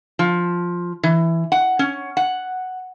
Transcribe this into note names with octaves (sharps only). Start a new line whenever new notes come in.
F3
E3
F#5
C#4
F#5